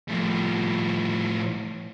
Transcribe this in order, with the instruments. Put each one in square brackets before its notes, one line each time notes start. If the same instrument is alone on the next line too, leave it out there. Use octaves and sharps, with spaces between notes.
[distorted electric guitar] A2 F3